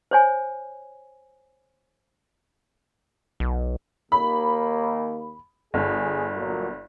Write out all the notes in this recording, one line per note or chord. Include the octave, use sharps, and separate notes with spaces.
C5 C#5 G#5
B1
D#2 A#3 B5
G1 G#4
A#2 F#3